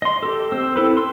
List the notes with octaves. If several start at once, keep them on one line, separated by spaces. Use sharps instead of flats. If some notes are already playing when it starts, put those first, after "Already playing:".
D#5 C6
G4 A4
C4 C5 E6
E4 A4 B4
C6 E6